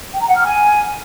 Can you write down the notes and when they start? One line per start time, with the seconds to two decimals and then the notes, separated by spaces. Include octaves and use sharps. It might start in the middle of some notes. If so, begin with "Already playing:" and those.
0.13 G5
0.20 A#5
0.28 F#5
0.36 F6
0.44 G#5